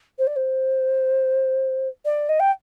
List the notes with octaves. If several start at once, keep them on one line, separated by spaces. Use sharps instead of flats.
C5
D5
C5
D5
D#5
G5